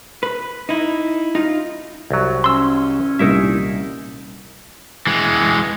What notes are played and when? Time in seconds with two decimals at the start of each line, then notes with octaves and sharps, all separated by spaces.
0.23 B4
0.69 D#4 E4
1.35 D#4 F4
2.11 C2 F#3
2.44 C#4 C6 E6
3.19 C2 A#2 G3 D#4 E4 E5
5.07 E3 G#3